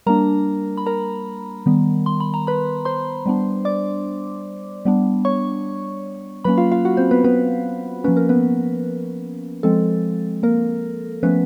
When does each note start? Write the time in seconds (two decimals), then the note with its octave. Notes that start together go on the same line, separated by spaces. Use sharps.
0.07 G3 A#3 D4 A#4 A#5
0.77 B5
0.86 A#4 A#5
1.66 D#3 G3 B3
2.06 C6
2.20 B5
2.34 A#5
2.47 B4 B5
2.85 C5 C6
3.26 G3 B3 D4
3.65 D5 D6
4.85 G3 B3 D4
5.25 C#5 C#6
6.44 F#3 A#3 C#4 B4 B5
6.57 F4 F5
6.72 F4 F5
6.85 F#4 F#5
6.97 C4 C5
7.11 B3 B4
7.24 B3 B4
8.04 F3 A#3 C#4 B4
8.17 A#4
8.29 B3 B4
9.63 F3 G#3 C4 A4
10.43 A#3 A#4
11.23 F3 A3 B3 C#4 B4